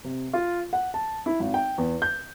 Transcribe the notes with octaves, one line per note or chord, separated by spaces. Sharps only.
C3
F4
F#5
A5
E4
G#1
G5
E2
G6